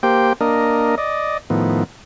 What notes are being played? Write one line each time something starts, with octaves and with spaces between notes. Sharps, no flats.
A#3 G4 C5 G5
A#3 D4 A#4 D#5
D5 D#5
A2 D#3 F3 B3